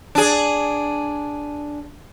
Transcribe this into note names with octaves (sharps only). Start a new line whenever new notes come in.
D4 G#4